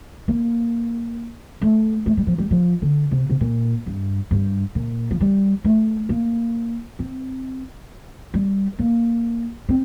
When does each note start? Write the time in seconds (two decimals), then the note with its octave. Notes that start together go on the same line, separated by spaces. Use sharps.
0.28 A#3
1.61 A3
2.06 A3
2.17 G3
2.27 F3
2.38 G3
2.51 F3
2.82 D3
3.11 C3
3.30 C3
3.41 A#2
3.86 G2
4.31 G2
4.75 A#2
5.11 F3
5.20 G3
5.64 A3
6.09 A#3
6.99 C4
8.34 G3
8.79 A#3
9.69 C4